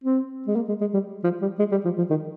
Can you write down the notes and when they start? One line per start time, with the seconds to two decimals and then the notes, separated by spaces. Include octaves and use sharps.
0.04 C4
0.47 G#3
0.56 A#3
0.69 G#3
0.81 G#3
0.94 G3
1.24 F3
1.42 G3
1.59 G#3
1.71 G3
1.85 F3
1.98 F3
2.10 D#3